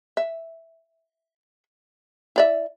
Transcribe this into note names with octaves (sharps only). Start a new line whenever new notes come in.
E5
E4 D5 E5